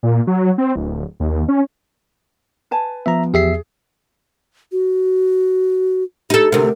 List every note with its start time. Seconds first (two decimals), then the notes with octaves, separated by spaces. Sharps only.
0.03 A#2
0.27 F#3
0.58 C4
0.76 D1
1.20 D#2
1.48 C#4
2.71 B4 G#5 A5
3.06 F3 B3 E5 A#5
3.34 E2 G4 G#4 E5 C7
4.72 F#4
6.30 D#4 G4 A4
6.52 D2 C3 A#4